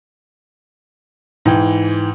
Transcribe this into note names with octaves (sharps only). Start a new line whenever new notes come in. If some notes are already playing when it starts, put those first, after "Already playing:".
G#2 E3 G5